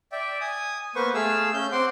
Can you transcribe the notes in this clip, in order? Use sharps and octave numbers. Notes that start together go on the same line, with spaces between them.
D5 E5 G5
G#5 D#6
A#3 B3 B4 C5 C#6
A3 G#4 F5 E6
C#4 G6
C4 F#5 C6 D6